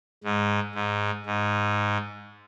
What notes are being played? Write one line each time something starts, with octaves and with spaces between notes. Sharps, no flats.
G#2
G#2
G#2